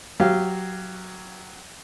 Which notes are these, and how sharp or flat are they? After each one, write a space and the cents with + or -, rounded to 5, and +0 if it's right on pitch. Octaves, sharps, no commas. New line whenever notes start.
F#3 +0 G4 -10 F5 -15